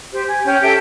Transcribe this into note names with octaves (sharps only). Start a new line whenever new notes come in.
G4 C5
G#5
C#4 G5 G6
G4 A4 E5